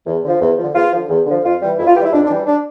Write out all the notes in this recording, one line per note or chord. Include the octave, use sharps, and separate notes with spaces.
E2
D3 F3
E2
D3 F3
E2 F4
D3 F3
E2
D3 F3
F2 F4
E3 G3
F2 E4
F4
E3 G3 E4 G4
F2 D4
D4
E3 G3
D4